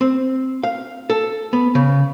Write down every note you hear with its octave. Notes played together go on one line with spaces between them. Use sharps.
C4
F5
A4
B3
C#3